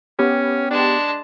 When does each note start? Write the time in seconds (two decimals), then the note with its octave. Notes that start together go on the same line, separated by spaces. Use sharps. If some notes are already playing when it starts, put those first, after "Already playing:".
0.19 B3 C#4 G4
0.71 G#3 D4 A5